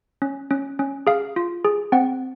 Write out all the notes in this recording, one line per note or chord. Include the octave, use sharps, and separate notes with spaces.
C#4
C#4
C#4
G#4 F5
F4
G#4
C4 F#5